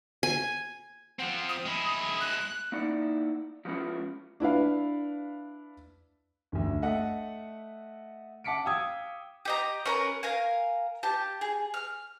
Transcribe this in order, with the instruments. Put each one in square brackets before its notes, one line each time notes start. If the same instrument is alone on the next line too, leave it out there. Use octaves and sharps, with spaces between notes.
[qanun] G#5
[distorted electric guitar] F3 C4 [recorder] F#5
[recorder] D#6
[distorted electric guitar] G#3 E4
[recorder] F#6
[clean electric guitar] A#3 D#4 E4 D5 F#5
F3 G#3 B3 C#4 E4 F4
[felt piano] D4 E4 B4 F5
[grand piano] G1 D2
A3 D#5 E5 F#5
F#5 A5 D6 B6 C#7 D7
F5 G5 D#6 E6 G#6
[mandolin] G4 D#5 A#5
C#4 A#4 B4
A#4 F5 G#5
G4 A5
G#4
F6